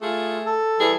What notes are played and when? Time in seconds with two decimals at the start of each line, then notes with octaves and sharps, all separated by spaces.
0.02 A3 F4 G#4
0.46 A4
0.79 E3 G3 G#4